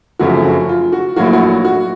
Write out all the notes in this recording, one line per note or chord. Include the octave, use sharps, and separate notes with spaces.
F#1 F#2 C#3 F3 A3 F#4
F#4
F4
F#4
A#1 A2 F#3 A#3 F#4
F#4
F#4